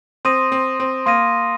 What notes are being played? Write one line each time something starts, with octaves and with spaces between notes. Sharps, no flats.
C4 C6 D#6 A#6 D#7
C4
C4
A#3 C6 D#6 A#6 D#7